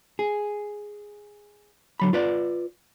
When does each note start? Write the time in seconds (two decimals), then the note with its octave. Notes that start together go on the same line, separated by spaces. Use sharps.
0.19 G#4
2.00 D3 F#3 B5
2.13 F4 B4 D5